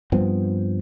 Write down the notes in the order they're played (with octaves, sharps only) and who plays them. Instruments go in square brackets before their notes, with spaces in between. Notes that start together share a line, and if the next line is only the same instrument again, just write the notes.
[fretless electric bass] G2 F3 B3 C4